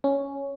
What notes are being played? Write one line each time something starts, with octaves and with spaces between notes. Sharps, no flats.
C#4